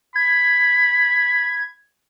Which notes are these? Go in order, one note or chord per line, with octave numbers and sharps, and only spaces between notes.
B5 G#6